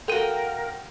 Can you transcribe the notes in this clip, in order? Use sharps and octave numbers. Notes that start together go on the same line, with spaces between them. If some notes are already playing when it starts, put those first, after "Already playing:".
F#4 A4 A#4 F5 G5 D#7